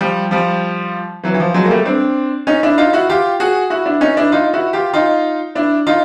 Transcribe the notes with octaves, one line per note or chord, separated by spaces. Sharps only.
F3 G3
F3 G3
E3 F#3
E3
F3
F#3 G#3
A#3
G3 A3
C4 D4
C#4 D#4
D4 E4
D#4 F4
E4 F#4
F4 G4
F#4 G#4
E4 F#4
D4 E4
C#4 D#4
D4 E4
D#4 F4
E4 F#4
F4 G4
D#4 F4
D4 E4
D#4 F4